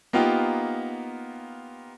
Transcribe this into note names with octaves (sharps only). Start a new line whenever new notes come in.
A#3 B3 D#4 F4 G4